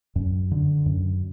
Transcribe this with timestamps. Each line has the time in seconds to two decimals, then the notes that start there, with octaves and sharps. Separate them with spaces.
0.16 F#2
0.51 D3
0.86 F#2